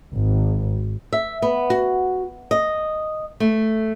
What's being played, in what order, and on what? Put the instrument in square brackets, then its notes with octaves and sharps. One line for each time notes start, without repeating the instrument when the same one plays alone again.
[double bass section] G#1
[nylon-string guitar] E5
B3
F#4
D#5
A3